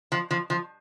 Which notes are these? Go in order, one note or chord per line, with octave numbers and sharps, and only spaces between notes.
F3
F3
F3